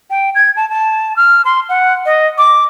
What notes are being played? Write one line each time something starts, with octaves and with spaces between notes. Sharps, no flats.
G5
G#6
A5
A5
F6
C6
F#5
D#5
D6